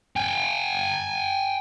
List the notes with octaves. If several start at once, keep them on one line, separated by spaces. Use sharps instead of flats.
G5 G#5